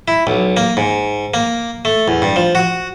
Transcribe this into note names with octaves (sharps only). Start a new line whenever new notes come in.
E4
B1
A#3
G#2
A#3
A3
E2
G2
F3
F#4